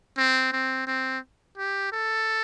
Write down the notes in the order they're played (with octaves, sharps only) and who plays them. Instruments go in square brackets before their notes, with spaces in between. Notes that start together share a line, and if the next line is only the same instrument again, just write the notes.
[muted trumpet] C4
C4
C4
G4
A4